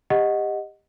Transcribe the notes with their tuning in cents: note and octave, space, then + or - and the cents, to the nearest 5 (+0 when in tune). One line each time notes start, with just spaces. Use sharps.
G4 +25 D#5 +0 F#5 +0